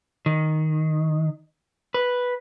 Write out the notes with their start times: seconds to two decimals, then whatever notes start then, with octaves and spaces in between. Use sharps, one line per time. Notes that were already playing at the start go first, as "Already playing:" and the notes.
0.26 D#3
1.94 B4